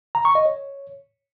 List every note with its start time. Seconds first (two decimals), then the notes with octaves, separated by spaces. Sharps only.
0.15 A#5
0.25 C#6
0.35 D#5
0.45 C#5